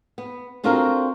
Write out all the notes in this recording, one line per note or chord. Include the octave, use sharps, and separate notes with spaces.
B3
C4 D4 F4 F#4 A4 A#4